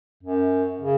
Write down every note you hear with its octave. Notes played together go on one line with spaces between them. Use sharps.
F#2
C#3